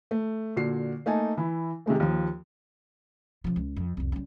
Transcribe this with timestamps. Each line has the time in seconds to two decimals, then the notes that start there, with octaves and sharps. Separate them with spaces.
0.11 A3
0.56 A#2 D3 F#4 C7
1.06 A3 A#3 D#4 G#5 A5
1.37 E3 E4
1.86 C3 D#3 G#3 A3
2.00 D#2 F3
3.44 C#3 F3
3.56 C#2
3.76 F2
3.97 C2 F2
4.12 C#3 G3